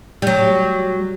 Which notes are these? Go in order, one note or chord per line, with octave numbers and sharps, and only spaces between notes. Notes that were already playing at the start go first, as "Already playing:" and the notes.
F#3 G3